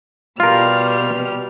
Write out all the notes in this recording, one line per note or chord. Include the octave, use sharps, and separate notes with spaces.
B2 G3 F4 A#4 F6